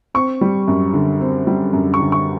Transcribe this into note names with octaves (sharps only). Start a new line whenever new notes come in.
C4 C#6
G3
F#2
D3
C4
G3
F#2
C#6
D3
C#6